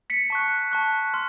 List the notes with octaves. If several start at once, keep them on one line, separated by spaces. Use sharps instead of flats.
B6 C#7
A5 C#6 F#6
A5 C#6 F#6
C6 F6